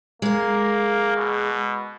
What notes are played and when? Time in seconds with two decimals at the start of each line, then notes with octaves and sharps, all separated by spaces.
0.22 G#3 A#3 A#4
1.17 B2